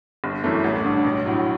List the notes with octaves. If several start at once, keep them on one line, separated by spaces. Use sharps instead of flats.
G1
F#2 E3 A3
A1
G2 D3
B1
A2 F#3